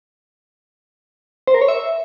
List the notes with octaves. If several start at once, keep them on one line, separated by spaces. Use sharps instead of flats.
C5
A#4
C#5
E5